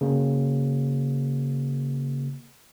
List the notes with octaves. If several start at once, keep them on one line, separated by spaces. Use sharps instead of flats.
C#3 A#3